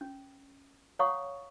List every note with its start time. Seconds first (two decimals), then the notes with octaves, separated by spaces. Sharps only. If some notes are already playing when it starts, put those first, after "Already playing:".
0.01 C#4
0.99 C#5 F5 F#5 A#5 C#6 D#6